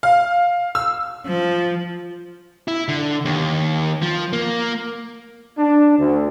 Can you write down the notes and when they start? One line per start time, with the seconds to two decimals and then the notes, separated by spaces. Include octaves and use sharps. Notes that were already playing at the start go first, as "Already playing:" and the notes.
0.03 F5
0.75 E6
1.26 F3
2.68 E4
2.88 D3
3.25 D#2
4.02 F3
4.33 A#3
5.58 D4
5.99 D2